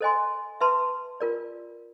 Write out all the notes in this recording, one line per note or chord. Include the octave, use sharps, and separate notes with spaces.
A4 C5 D#5 G#5 C6
B4 E5 A5 C6
F4 A#4 D5